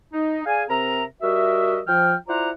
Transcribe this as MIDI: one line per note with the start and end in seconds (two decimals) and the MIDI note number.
0.13 0.40 63
0.45 0.63 68
0.45 0.63 74
0.45 0.63 77
0.45 0.63 80
0.69 1.03 48
0.69 1.03 60
0.69 1.03 70
0.69 1.03 76
0.69 1.03 82
1.22 1.80 55
1.22 1.80 66
1.22 1.80 70
1.22 1.80 75
1.22 1.80 76
1.87 2.14 53
1.87 2.14 79
1.87 2.14 89
2.28 2.50 64
2.28 2.50 65
2.28 2.50 72
2.28 2.50 74
2.28 2.50 78
2.28 2.50 82